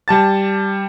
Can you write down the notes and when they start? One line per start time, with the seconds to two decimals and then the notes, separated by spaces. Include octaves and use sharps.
0.08 G3 A5 A6